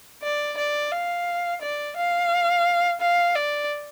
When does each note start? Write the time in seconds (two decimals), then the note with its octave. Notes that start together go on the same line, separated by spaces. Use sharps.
0.23 D5
0.57 D5
0.92 F5
1.61 D5
1.97 F5
3.01 F5
3.35 D5